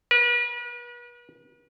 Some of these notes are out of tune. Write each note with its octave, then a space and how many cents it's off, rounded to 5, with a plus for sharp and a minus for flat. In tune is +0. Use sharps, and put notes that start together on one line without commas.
B4 -40